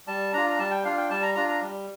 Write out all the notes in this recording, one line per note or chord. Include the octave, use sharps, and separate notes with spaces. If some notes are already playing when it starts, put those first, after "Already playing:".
G3 A5
D4 F4 A#5
A#5
G3 A5
G5
D4 F4 F5
G5
G3 A5
A#5
D4 F4 A#5
A#5
G3